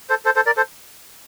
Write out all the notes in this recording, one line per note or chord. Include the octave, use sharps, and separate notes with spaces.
A4 C5
A4 C5
A4 C5
A#4 D5
A4 C5